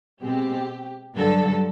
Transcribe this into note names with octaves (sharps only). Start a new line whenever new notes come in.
B2 G#3 C4 G4
G2 D3 F#3 A4